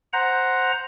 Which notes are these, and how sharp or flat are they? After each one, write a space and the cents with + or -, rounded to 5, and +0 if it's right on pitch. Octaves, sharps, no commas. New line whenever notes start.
C5 +0 F#5 +0 A#5 +5